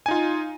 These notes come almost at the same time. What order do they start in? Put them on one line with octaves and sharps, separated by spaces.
G#5 D#4 F4